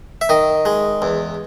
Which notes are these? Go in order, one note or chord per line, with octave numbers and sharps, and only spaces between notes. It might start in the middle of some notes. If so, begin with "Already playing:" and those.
E5
D#3 D#5
G#3
E2